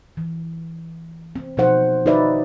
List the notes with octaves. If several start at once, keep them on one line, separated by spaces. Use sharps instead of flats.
E3
C4
B2 F3 D#4 C5 F#5
D#4 F#4 B4 D5 E5